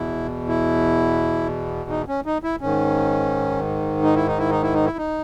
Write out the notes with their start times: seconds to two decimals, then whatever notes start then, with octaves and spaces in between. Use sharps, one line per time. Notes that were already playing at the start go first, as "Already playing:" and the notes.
Already playing: E2 B2 E4
0.48 E4
1.90 D#4
2.08 C#4
2.26 D#4
2.43 E4
2.61 G#2 D#3 C#4
4.03 D#4
4.15 E4
4.27 D#4
4.38 E4
4.50 D#4
4.62 E4
4.74 D#4
4.86 E4
4.97 D#4